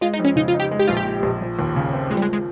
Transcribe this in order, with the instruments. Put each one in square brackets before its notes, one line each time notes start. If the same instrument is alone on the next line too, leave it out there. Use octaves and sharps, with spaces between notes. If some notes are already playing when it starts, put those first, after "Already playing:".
[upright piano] G#3 [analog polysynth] F4
[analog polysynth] D#4
[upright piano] F2
[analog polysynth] C#4
[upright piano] C#3 [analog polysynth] D#4
[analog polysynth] F4
[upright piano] D#4
[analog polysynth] G4
[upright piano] G#3
[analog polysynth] G4
[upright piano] A#1 [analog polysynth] F4
[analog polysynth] G4
[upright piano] A#2
A#1
F3
D#2
C#3
C4
[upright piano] F3 [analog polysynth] G#3
[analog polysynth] G3
G#3
G#3